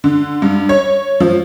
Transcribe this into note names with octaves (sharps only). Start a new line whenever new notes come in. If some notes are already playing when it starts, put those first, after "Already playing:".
D3
G2
C#5
F3